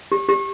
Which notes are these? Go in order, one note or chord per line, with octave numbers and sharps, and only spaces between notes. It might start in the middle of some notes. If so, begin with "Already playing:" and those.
G4
G4